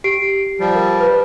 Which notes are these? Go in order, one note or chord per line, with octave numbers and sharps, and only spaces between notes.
G4 C7 D7
F3 G3
A#4
B4